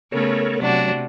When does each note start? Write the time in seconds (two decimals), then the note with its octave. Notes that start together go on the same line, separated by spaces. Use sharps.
0.12 C#3 A3 B3 A4 A#4 C#5
0.62 C3 F#3 D4 F#4